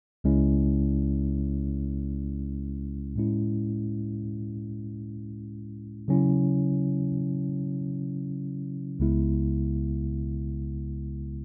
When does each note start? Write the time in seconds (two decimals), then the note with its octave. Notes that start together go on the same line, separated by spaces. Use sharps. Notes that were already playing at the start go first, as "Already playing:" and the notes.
0.24 C#2 C#3 G#3 C#4 E4
3.16 A2 G#3 C#4 E4
6.08 C#3 F#3 C#4 E4
8.99 C#2 C#3 G#3 B3 E4